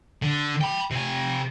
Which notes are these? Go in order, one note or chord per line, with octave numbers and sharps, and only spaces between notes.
D3
G5 B5
C3 G#5